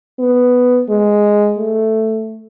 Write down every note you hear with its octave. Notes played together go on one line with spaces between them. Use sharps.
B3
G#3
A3